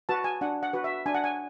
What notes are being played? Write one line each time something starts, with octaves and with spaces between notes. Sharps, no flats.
F#4 B4 A5
G#5
D4 F#5
F#5
F#4 B4
E5
D4 G#5
F#5
G#5